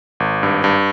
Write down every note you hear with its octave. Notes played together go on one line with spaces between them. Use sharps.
G#1
G2
G2